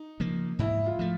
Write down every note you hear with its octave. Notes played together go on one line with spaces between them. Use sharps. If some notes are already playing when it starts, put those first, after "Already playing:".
Already playing: D#4
C#3 F3 A#3
G#2 E4
F4
F3 A3